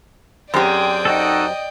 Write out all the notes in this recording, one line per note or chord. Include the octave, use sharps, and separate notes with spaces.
F#2 C4 G4 G#4 C5 D5 G5
D#4 F#4 A4 D#5